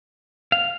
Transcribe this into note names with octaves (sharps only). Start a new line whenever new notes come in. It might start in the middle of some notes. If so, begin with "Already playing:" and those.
F5